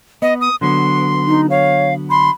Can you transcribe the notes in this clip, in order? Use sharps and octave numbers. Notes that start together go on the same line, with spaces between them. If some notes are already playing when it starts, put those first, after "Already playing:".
B3 D#5
D#6
D3 F#3 B3 C6
D#4
C#5 F5
B5 C6